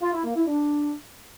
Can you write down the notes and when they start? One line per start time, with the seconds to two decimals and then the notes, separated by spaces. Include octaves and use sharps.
0.02 F4
0.13 E4
0.24 A#3
0.36 E4
0.47 D4